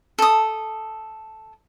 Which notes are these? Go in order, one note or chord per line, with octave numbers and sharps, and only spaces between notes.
A4 D#6